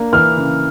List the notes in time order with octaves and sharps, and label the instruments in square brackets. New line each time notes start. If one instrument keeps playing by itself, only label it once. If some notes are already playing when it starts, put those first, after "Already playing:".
Already playing: [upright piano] A#3 D4
[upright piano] E3 [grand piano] F6
[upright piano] C#3